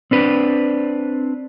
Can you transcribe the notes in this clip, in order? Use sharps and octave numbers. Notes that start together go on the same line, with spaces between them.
C4 D4 B4